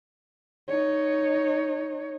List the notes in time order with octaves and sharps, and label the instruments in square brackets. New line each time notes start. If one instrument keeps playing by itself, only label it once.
[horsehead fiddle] D#4 C#5